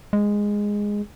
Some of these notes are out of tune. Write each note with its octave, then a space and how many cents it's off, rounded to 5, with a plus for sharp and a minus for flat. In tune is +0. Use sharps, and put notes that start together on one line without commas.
G#3 -10